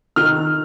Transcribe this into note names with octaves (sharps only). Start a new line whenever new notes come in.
D#3 F6